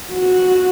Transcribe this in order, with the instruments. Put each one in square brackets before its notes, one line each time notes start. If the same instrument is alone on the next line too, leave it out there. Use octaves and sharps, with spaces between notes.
[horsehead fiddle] F#4